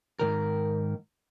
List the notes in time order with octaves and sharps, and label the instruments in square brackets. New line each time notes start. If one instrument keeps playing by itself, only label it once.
[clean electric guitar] G#2 D#3 A#4